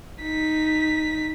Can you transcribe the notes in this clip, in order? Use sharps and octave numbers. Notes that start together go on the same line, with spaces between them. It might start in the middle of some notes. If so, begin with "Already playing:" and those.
D#4 B6